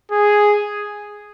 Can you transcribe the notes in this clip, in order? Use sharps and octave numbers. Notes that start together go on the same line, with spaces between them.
G#4